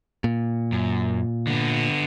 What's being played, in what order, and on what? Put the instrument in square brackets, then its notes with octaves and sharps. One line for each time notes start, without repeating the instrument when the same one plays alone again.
[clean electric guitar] A#2
[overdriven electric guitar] F#2
D3 B3